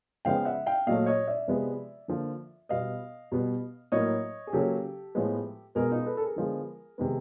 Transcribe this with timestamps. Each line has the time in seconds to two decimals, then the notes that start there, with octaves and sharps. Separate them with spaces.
0.25 C#3 F3 G#3 B3 F5 G5
0.45 E5 F#5
0.66 F5 G5
0.87 A#2 F#3 A3 D#5 F5
1.06 C#5 D#5
1.28 D5 E5
1.48 C3 F3 G#3 B3
2.08 D3 F3 A#3
2.69 B2 G3 B3 D#5 F5
3.32 B2 G3 B3
3.92 A2 F#3 A#3 C#5 D#5
4.47 G#4
4.53 C#3 F#3 A#3 G4 A4
5.15 A2 F3 G#3 B3
5.75 B2 G#3 B3 G#4 A#4
5.91 D#4 F4
6.06 A4 B4
6.17 A4
6.21 G#4 A#4
6.36 D3 F3 G#3 B3
6.98 C3 D#3 G#3 B3